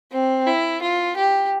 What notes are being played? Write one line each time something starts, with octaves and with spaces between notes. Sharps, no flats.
C4
E4
F4
G4